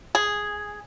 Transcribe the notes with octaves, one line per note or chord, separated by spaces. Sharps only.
G#4